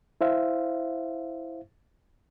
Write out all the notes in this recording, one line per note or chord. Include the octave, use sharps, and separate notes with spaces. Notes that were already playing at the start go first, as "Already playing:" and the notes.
E4 C5 E5 F5